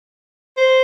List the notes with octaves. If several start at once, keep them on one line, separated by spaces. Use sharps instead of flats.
C5